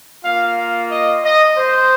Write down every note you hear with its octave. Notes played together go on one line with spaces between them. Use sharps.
A#3 F4 F5
F5
D#5
D#5
C5